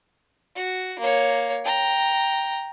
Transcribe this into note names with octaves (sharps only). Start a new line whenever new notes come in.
F#4
A#3 C#5
G5 A#5